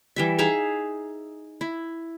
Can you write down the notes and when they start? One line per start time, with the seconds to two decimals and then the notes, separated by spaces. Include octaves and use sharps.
0.16 E3 G3 E5
0.39 D#4 G#4 E5 F5
1.61 E4